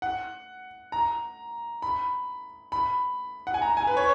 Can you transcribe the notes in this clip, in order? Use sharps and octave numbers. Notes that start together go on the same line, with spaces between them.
F#5
A#5
B5
B5
F#5
G#5
A#5
G#5
B4
C#5